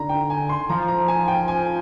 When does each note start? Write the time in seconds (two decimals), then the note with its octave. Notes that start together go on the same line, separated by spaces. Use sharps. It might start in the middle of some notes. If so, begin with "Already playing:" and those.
Already playing: D3 A#5
0.09 G5
0.30 G#5
0.49 C6
0.69 F3 A#5
0.88 A#5
1.08 G#5
1.28 G5
1.48 G#5